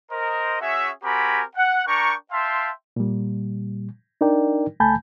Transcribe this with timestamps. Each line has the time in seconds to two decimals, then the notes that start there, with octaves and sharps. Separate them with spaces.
0.11 A#4 C5 D#5
0.61 C#4 F#4 G#4 C#5 E5
1.03 C4 F#4 G4 A#4 G#5 B5
1.56 F#5
1.87 D4 A#4 G5 A#5 C#6
2.32 E5 F5 G5 A5 C6
2.96 A#2 G3
4.21 D4 D#4 A#4 D5 G5
4.80 C#2 A3 G#5 A5 B5 G6